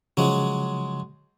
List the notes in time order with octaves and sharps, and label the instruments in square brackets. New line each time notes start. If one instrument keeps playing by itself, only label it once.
[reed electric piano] C#3 F3 [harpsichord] F#3 G#3